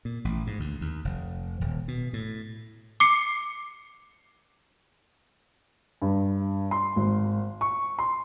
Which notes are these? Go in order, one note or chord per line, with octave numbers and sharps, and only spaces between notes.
A#2
A1
G#2
D2
D#2
F1
D#1
B2
A2
D6 C7 C#7
G2
C6
G#1
C#6
C6